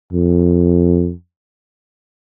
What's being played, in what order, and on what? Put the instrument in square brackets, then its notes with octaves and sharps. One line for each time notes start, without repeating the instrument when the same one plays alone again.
[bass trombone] F2